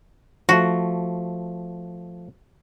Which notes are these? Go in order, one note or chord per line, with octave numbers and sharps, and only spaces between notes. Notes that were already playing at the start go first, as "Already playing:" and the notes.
F3 A3 F#4